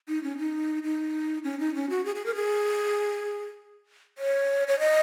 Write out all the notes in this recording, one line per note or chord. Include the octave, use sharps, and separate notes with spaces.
D#4
C#4
D#4
D#4
C#4
D#4
C#4
F#4
G#4
G#4
A#4
G#4
C#5
C#5
D#5